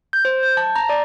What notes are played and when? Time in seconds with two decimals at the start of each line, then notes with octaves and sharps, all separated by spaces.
0.13 G6
0.25 C5
0.43 G6
0.57 A5
0.76 A#5
0.89 D5